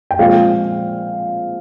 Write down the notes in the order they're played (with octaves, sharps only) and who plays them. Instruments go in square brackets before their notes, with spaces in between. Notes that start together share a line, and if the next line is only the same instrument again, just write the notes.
[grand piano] G5
A#2 F3 G#3 C4 F5